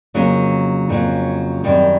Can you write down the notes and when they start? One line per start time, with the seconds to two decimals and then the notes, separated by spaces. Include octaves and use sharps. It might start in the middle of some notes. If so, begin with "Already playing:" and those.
0.14 F2 C#3 F#3 A#3
0.89 F2 C#3 F#3 A#3
1.64 F#2 D#3 G3 C4